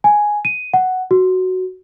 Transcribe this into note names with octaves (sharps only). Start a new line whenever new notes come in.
G#5
D#7
F#5
F#4